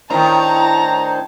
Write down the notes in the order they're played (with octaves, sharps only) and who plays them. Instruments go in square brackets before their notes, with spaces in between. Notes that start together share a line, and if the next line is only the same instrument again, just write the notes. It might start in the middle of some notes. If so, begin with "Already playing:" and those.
[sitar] A2 D#3 [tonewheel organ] D4 C5 [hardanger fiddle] A5 [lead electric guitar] A#5